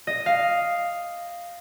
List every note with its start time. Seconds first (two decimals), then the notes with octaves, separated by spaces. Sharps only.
0.07 D#5
0.26 F5